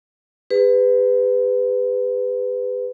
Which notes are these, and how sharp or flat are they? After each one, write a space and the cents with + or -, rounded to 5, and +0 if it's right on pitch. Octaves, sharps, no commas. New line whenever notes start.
G#4 -45 B4 +20